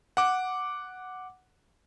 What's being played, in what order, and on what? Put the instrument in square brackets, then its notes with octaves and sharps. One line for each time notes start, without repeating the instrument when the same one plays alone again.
[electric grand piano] F#5 D6